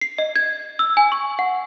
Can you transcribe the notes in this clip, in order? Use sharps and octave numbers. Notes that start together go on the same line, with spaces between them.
C7
D#5
G#6
E6
G#5
C#6
F#5